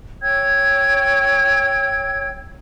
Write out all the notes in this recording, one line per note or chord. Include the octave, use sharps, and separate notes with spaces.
C#5 G5 E6 G#6